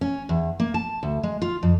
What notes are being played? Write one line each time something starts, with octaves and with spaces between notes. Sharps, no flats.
C#4
E2
A#3
A5
D2
G#3
F4
F2